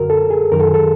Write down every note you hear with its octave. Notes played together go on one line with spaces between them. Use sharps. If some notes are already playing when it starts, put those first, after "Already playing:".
Already playing: F#2 D3 F#4 A#4
A4
G#4
F#2 D#3 A#4
A4
G#4
A4